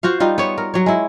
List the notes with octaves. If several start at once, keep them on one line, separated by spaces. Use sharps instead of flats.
F4 F#4 C5 F5
G3 D#4 F4
B3 C#5
A#4
F#3 C#5
G#3 E4